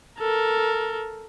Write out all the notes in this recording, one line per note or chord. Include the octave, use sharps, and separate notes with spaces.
A4 A#4